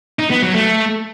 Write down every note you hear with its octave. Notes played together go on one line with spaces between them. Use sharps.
D#4
B3
F#3
A3